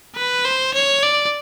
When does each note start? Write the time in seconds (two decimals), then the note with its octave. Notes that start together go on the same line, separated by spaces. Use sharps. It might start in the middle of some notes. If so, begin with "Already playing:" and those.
0.16 B4
0.45 C5
0.74 C#5
1.03 D5